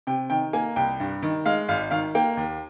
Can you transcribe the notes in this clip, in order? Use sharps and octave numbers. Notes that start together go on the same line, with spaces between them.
C3 G5
D#3 G5
A#3 G#5
C2 G5
G2
D#3
G#3 F5
G#1 F5
D#3 F5
A#3 G5
D#2